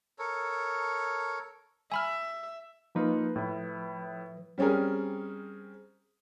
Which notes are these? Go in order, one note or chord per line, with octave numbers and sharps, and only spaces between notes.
A4 A#4 C#5
E5 G#5 B5 F6
F3 A#3 D#4 F4 B4
A2 E4
G3 C4 C#4 G#4 A#4